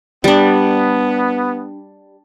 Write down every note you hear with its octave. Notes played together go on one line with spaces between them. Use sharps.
G3 B3 D4